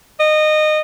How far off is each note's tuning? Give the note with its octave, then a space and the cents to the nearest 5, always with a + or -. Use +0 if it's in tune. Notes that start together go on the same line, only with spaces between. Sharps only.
D#5 -20